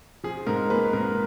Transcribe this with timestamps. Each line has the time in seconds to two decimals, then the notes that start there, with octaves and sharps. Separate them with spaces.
0.24 F3 G#4
0.46 G#2 A#4
0.70 A#3 B4
0.93 G#2 A#4